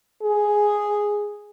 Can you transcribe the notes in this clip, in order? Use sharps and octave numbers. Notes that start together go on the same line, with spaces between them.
G#4